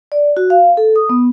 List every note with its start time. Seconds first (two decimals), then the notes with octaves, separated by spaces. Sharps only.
0.12 D5
0.37 F#4
0.50 F5
0.77 A4
0.96 D#6
1.09 B3